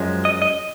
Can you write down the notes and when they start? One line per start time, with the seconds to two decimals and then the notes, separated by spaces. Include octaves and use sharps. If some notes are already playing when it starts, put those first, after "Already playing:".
Already playing: F#2 F3 G#3
0.25 D#5
0.42 D#5